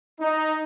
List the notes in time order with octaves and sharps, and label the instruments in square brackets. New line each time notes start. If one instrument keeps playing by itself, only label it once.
[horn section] D#4